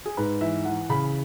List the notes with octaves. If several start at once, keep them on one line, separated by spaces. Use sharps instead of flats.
G#4
G#2 B4
E3 E5
E3 F#5
C#3 B5